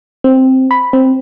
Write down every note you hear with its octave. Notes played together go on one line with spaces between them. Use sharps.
C4
B5
C4